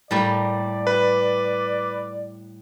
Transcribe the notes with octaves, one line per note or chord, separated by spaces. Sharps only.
A2 G3 A#3 D5
B4